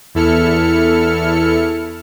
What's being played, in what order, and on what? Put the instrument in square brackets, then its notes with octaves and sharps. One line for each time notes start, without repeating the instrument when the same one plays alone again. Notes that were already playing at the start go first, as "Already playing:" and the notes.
[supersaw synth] E2 E4 A4 F6 C#7